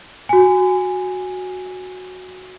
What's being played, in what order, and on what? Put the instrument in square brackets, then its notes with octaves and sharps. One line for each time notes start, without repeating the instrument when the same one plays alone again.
[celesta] F#4 G#5